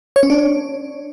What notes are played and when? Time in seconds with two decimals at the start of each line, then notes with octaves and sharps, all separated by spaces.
0.16 C#5
0.23 C#4
0.30 D4